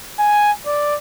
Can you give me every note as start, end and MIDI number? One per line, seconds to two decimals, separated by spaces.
0.19 0.51 80
0.66 0.96 74